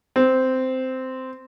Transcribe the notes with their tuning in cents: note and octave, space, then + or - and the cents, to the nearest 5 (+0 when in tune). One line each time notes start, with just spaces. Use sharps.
C4 -10